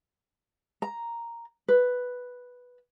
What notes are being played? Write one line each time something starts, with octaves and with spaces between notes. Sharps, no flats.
A#5
B4